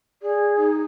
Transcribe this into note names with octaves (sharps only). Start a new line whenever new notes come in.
G#4 D5
D#4